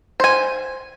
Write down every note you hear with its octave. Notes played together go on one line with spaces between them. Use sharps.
C5 G#5